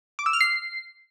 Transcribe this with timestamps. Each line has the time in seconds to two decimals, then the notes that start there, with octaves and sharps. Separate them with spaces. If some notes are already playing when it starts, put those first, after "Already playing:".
0.19 D6
0.26 E6
0.33 F6
0.41 C7